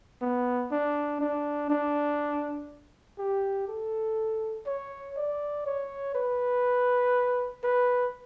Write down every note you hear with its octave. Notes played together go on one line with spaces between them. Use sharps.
B3
D4
D4
D4
G4
A4
C#5
D5
C#5
B4
B4